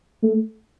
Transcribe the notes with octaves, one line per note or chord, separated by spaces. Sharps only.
A3